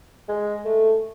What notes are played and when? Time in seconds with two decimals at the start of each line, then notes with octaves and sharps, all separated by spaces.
0.28 G#3
0.65 A3